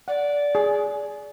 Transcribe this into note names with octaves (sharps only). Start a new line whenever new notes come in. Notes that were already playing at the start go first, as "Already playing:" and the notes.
D5 F#5
G#4